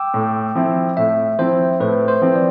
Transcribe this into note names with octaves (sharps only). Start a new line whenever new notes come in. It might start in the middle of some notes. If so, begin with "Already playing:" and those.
Already playing: G5 D6 E6
A2
F3 C4 E4
A2 E5
F3 C4 E4 C5
A2 B4
C5
F3 C4 E4
D5